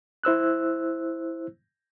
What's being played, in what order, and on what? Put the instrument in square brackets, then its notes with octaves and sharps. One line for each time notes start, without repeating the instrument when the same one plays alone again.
[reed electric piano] E4 C5 E6 F#6